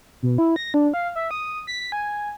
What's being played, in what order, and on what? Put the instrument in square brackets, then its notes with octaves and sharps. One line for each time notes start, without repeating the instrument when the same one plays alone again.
[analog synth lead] B2
E4
A#6
D4
F5
E5
D#6
B6
G#5